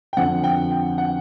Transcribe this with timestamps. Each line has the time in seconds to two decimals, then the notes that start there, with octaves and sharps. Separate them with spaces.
0.13 G5
0.17 F2 D3 F3 F#5
0.44 G5
0.71 G5
0.98 F#5